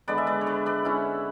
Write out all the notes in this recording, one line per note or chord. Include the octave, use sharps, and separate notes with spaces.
D3 G#3 B3 B4 D5
E5
B4 D5
C#5
B4 D5
B4 D5
C#4 E4